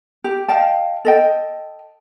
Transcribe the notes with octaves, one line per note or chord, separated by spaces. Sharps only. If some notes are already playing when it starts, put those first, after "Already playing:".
G4
D#5 F5 G5 A5
A4 D#5 G5